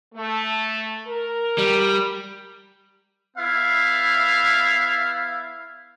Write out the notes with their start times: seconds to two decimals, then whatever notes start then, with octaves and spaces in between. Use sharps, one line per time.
0.15 A3
1.07 A#4
1.58 G3
3.37 B3 E4 E5 F5